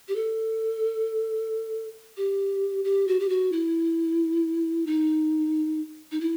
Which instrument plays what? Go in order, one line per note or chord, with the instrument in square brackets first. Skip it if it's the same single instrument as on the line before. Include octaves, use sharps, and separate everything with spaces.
[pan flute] G4
A4
G4
G4
F#4
G4
F#4
E4
D#4
D#4
E4